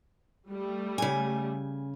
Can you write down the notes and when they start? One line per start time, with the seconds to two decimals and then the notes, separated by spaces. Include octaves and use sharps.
0.49 G3 A3
0.98 C#3 G#5